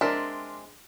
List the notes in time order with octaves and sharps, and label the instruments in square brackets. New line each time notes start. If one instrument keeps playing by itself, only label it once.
[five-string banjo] G#3 C4 E5 [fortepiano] D4 A#4